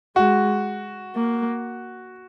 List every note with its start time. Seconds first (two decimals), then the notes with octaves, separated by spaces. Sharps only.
0.16 G#3 F#4
1.16 A#3